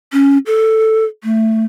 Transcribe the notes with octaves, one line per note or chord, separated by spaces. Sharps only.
C#4
A4
A3